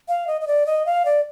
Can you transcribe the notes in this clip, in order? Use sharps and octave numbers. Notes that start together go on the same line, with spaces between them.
F5
D#5
D#5
D5
D#5
F5
D5